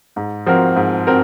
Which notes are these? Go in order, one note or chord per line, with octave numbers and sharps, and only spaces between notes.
G#2
F3 C4 F#4 A#4
G#2
C4 F#4 A#4